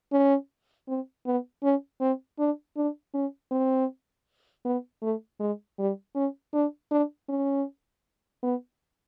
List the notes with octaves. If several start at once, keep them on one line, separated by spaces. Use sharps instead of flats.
C#4
C4
B3
C#4
C4
D4
D4
C#4
C4
B3
A3
G#3
G3
C#4
D4
D4
C#4
B3